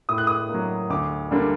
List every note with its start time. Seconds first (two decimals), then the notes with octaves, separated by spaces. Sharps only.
0.09 A2 D#6
0.18 F#6
0.27 D#6
0.49 A#3
0.54 F#3
0.90 D2 D6
1.31 D3 G3 A#3 D4